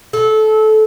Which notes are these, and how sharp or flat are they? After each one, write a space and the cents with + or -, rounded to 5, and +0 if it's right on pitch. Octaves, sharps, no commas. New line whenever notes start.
A4 -20